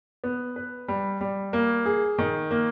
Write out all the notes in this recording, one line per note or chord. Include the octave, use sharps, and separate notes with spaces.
B3
B4
G3
G3
A#3
G#4
D#3
A#3